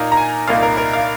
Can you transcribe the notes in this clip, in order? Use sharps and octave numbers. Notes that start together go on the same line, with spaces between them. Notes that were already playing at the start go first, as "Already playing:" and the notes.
Already playing: A#2 A#3 D#4 A#5
A#5
G#5
C2 A#2 A#3 D#4 F5
A#4
A#4
F5